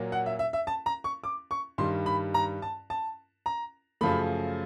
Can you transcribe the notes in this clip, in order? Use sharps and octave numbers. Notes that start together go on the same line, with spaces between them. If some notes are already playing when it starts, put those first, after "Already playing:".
Already playing: A#2 F#3 A#3
F#5
E5
E5
E5
A5
A#5
C#6
D6
C#6
G2 D#3 G3 C6
B5
A#5
A5
A5
A#5
F#2 C#3 F3 A3 B5